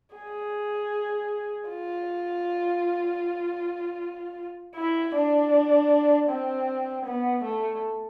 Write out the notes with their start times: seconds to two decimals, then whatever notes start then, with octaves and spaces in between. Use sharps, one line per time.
0.16 G#4
1.69 F4
4.76 E4
5.15 D4
6.30 C4
7.06 B3
7.44 A3